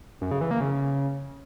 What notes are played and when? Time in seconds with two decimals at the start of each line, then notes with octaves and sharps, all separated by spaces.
0.21 F#2
0.31 C#3
0.41 E3
0.51 A#3
0.61 C#3